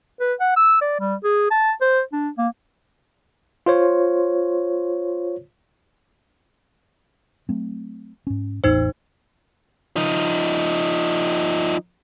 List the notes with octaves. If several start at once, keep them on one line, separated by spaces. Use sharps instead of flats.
B4
F#5
E6
D5
G3
G#4
A5
C5
D4
A#3
F4 C5 C#5
F#3 A3 C4
G#2 C#4
A1 E2 A2 D#4 C5
F3 D#4